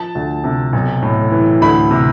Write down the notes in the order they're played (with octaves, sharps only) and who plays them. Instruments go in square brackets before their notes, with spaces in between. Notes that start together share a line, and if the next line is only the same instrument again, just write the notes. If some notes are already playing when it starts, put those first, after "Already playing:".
Already playing: [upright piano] F3 A5
D2
C3
B1
A2
E3
D2 B5
C3